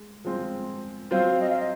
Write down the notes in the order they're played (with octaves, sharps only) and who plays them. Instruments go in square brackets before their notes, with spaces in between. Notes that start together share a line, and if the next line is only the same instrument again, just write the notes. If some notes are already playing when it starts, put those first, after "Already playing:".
Already playing: [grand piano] G#3
F3 G#3 C4 F4
[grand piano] F#3 C4 F4 C5 [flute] F5
[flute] D#5
F5
D#5